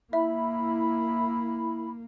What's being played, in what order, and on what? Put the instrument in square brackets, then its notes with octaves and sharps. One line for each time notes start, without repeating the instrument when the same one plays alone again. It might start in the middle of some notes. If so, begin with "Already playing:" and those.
[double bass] A#3 [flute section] E4 B5 [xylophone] E5